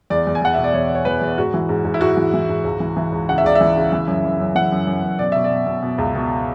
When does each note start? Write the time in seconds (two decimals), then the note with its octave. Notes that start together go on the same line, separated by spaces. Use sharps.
0.10 E2 D5
0.27 E2
0.35 G#5
0.42 E2 F#5
0.54 B2 E5
0.64 D5
0.73 E2 C#5
0.90 B2
0.95 C#5
1.05 E2 B4
1.21 E2
1.38 G#2 F#4
1.54 E3
1.69 G#2
1.85 G#2
1.94 E4
2.01 G#2 F#4
2.17 E3
2.34 E3
2.49 G#2
2.64 C#2
2.80 E3
2.97 E3
3.12 C#2
3.29 C#3 F#5
3.38 E5
3.44 C#2 D5
3.55 E5
3.61 E3
3.77 C#3
3.92 E3
4.07 F#2
4.24 F#2
4.40 F#2
4.55 E3 F#5
4.72 F#2
4.87 F#2
5.04 F#2
5.19 B2 D5
5.32 B2 E5
5.44 D5
5.50 B2
5.66 B2
5.82 B2
5.98 C#2
6.15 B2